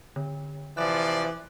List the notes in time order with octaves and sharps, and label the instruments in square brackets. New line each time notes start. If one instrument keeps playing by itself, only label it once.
[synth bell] D3
[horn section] C3 F3 D5 [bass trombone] E3 [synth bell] F#6